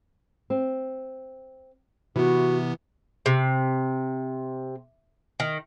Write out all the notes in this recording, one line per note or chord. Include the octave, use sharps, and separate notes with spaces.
C4
C3 E3 B3 F#4
C3
D#3